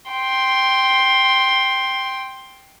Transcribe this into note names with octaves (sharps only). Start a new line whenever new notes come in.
G5 C6